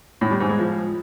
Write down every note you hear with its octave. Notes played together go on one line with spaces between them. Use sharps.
A2
G3
G#2
G#3
F3